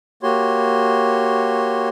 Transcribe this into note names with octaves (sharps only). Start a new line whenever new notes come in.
A#3 F#4 G4 C#5 C6